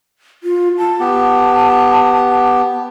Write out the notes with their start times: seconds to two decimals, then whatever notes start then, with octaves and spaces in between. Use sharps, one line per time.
0.43 F4
0.78 A5
1.00 B3 G4